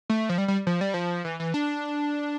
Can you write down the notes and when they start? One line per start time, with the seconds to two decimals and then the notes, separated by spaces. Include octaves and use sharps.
0.10 A3
0.29 F3
0.38 G3
0.48 G3
0.67 F3
0.81 G3
0.94 F3
1.25 E3
1.40 E3
1.54 D4